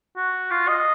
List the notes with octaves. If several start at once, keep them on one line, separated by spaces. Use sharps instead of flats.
F#4
F4
D#5